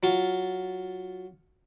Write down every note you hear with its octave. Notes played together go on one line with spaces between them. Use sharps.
F#3 F4